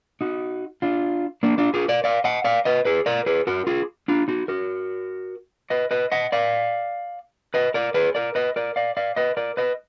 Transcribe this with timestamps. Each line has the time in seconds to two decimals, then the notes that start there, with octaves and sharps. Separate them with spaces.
0.21 D#4 F#4
0.82 D4 F4
1.43 A#3 D4
1.58 D4 F4
1.74 F4 G#4
1.88 A#4 D5
2.04 D5 F5
2.24 D#5 F#5
2.44 D5 F5
2.65 B4 D#5
2.85 G#4 B4
3.06 A#4 D5
3.26 G#4 B4
3.47 F#4 A#4
3.67 F4 G#4
4.08 D4 F4
4.28 D#4 F#4
4.48 F#4 A#4
5.70 B4 D#5
5.91 B4 D#5
6.12 D#5 F#5
6.32 D5 F5
7.54 B4 D#5
7.74 A#4 D5
7.94 G#4 B4
8.15 A#4 D5
8.35 B4 D#5
8.56 A#4 D5
8.76 D5 F5
8.97 D5 F5
9.16 B4 D#5
9.37 A#4 D5
9.57 B4 D#5